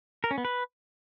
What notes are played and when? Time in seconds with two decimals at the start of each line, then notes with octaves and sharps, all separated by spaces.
0.24 A#4
0.31 C#4
0.38 B3
0.45 B4